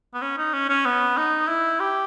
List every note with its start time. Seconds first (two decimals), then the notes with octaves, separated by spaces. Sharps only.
0.14 B3
0.22 C#4
0.38 D#4
0.54 C#4
0.69 C#4
0.85 B3
1.17 D#4
1.49 E4
1.80 G4